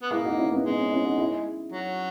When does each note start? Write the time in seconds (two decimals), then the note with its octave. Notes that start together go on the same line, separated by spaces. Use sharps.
0.02 B3
0.11 A#3 E4 G#4
0.25 D#4 F#4
0.38 C#4 E4
0.51 B3 D#4
0.64 G#3 B3
0.78 C#4
0.91 C#4 E4
1.04 D#4 F#4
1.18 E4 G#4
1.72 F#3